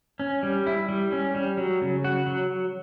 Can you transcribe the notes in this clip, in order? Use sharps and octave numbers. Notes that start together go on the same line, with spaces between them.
C#4
G3
E4
G3
C#4
G3
F#3
C#3
F#4
F#3